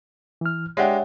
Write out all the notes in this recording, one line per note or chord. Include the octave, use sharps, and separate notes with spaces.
E3 F6
G#3 D4 G4 C#5 E5 F#5